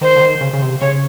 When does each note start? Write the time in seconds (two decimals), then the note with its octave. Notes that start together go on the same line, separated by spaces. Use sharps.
0.01 D#3 C5
0.16 D3
0.21 D#3
0.41 C#3
0.53 C#3
0.62 C3
0.81 C#3 C#5